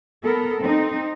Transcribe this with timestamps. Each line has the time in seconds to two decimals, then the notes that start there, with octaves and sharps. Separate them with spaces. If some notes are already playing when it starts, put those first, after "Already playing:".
0.22 B3 A4 A#4
0.61 C4 D#4